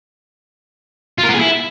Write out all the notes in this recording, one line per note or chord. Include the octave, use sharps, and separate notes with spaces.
F4
A#4
B3
G#4
E4